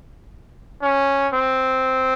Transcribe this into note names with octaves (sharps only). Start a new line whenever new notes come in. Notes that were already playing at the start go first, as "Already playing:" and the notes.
C#4
C4